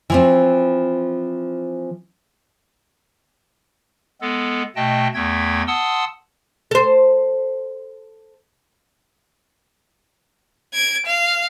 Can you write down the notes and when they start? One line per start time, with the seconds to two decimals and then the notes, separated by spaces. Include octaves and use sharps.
0.10 E3 F3 C4
4.21 G#3 B3 A4
4.76 B2 A3 D#5 G5 A5
5.14 E2 A3 G5 G#6
5.67 F#5 A5 C6 D#6 E6
6.71 A4 C5
10.74 G#6 D7
11.06 F5